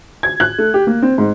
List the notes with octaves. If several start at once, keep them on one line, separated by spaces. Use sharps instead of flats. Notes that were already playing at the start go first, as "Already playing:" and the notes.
G#6
F#6
A3
G4
A#3
C4
G#2